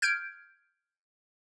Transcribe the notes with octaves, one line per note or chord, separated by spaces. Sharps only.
F6 G6 G#6 D7